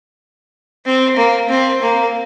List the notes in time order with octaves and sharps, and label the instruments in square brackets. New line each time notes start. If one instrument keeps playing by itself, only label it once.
[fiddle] C4
A#3
C4
A#3